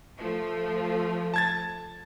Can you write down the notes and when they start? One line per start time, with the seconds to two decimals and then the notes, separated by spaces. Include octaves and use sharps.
0.19 F3 A3
1.34 A5 G#6 A6